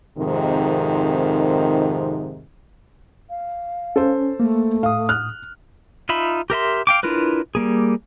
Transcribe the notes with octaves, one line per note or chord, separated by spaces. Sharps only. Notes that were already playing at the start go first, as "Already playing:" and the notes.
F2 G#2 C3 D#3
F5
C#4 A4 C5
A3 A#3
A2 F5 D#6
F6 F#6
D#4 F4 E5 B5
G4 A#4 E5 C6
F5 G5 D6
D4 E4 F4 A#4 B4
G3 A#3 G#4